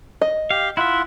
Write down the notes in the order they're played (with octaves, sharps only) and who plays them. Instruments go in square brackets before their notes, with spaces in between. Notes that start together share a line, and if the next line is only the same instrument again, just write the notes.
[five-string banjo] D#5
[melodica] G4 [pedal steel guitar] F5
[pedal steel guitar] E4 E5 [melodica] F4 F#5